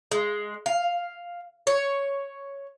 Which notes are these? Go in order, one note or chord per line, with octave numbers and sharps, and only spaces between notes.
G#3
F5
C#5